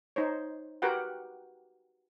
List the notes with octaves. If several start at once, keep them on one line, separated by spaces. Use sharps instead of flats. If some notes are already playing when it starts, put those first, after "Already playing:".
D#4 C5 C#5
F#4 G4 A#4 B4 F#5 G5